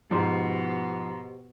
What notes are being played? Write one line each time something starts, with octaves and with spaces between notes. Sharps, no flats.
G#2 B2 F3 G4 C5